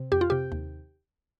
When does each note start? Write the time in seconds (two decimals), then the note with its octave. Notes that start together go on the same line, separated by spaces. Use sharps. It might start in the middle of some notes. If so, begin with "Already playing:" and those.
Already playing: C3
0.12 F2 G4
0.21 F4
0.30 C3 G4
0.52 D#2